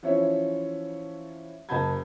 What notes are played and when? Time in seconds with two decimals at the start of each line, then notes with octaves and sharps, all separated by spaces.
0.03 E3 F3 C#4 E4 C#5 E5
1.69 F#1 D#5 A5 B5 G6 G#6